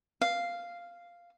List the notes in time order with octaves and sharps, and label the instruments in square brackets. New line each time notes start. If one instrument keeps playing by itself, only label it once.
[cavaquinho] F5